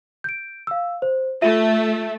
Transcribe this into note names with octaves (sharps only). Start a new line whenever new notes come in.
G6 D7
F5 E6
C5
A3 F4 E5 D#7